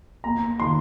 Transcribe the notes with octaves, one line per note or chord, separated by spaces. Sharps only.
A#3 A#5
D#3 C6